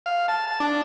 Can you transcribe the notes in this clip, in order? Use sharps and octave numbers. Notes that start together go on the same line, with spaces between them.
F5
A5
A5
D4